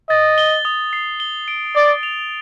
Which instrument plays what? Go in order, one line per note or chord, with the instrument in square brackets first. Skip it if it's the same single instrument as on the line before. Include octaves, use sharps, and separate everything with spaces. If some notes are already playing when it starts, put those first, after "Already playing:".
[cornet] D#5 [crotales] A6
[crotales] G7
D#6
C7
G7
D7
[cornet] D5 [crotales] A6
[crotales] F7